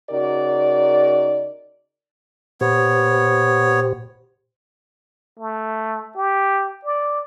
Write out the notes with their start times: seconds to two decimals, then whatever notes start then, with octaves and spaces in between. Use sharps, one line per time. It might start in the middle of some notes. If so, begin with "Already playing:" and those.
0.10 C#3 D#4 F#4 A#4 D5
2.61 A#2 B3 G4 C5 C#5
5.39 A3
6.16 G4
6.85 D5